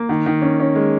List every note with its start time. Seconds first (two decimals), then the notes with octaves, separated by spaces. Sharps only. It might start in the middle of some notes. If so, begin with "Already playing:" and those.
Already playing: A#3
0.09 D#3
0.26 D#3
0.42 C#4
0.60 C#4
0.76 G#3